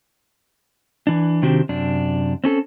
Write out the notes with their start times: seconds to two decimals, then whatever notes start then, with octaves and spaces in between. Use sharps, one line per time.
1.07 E3 D4
1.42 C3 D#3 C4 D4 F#4 G4
1.69 F#2 C3 D4
2.44 C4 C#4 A4